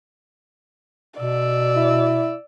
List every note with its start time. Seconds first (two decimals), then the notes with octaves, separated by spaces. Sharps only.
1.20 B2 D5 E6
1.76 E4